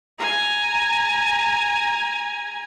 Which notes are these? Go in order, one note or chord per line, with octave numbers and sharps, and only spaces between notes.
G#5 A#5